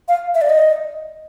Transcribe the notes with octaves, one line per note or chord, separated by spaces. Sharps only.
F5
E5
D5
D#5